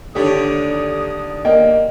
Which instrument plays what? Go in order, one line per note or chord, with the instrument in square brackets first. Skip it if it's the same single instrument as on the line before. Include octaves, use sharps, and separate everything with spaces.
[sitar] D#2 D3 D4 [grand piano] A3 G4 C#5 [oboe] D#6
[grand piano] A#3 G5 [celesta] D#5